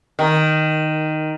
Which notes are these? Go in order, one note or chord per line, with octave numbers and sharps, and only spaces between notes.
D#3